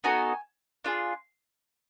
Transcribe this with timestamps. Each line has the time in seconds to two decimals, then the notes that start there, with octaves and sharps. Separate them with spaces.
0.04 B3 D#4 F#4 A4 G#5
0.84 D4 F4 G#4